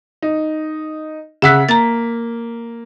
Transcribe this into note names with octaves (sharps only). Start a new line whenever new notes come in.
D#4
C#3 E5 F#5 E6 F#6 B6
A#3 A#5 A6